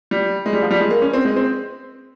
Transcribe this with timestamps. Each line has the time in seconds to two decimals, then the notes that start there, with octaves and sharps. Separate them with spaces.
0.11 G3
0.46 G#3
0.53 G3
0.62 F3
0.71 G3
0.80 G#3
0.90 A#3
1.02 C#4
1.13 C4
1.25 G#3
1.36 C4